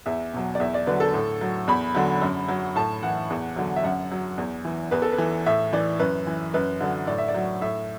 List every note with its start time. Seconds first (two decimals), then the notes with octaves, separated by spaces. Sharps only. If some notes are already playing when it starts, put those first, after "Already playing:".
0.06 E2 E5
0.34 B2 F#3
0.55 D5
0.60 E2 E5
0.74 D5
0.87 D3 F#3 B4
1.00 A4
1.14 A2
1.41 F#3
1.68 E2 B5
1.95 D3 F#3
2.22 F#2
2.48 F#3
2.75 A2 A5
3.03 E3 F#5
3.30 E2
3.56 D3 F#3
3.76 E5
3.84 F#2 F#5
4.12 F#3
4.38 E2
4.65 E3
4.91 E2 B4
5.02 A4
5.13 B4
5.18 E3
5.46 A2 E5
5.73 E3 D5
6.00 F#2 B4
6.27 E3
6.54 F#2 B4
6.81 D3 F#3
7.07 A2 D5
7.18 E5
7.28 D5
7.34 F#3
7.61 A2 E5